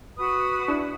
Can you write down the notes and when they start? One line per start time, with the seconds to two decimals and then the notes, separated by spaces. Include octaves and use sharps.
0.17 F#4 B4 D#6
0.68 D4 E4